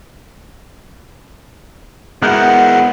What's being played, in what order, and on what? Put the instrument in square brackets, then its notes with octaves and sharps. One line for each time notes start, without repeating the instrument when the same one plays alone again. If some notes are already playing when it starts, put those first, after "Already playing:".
[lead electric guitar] G#3 F#4 [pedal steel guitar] B3 F#6 G6 [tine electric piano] E4 A#4 [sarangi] F#5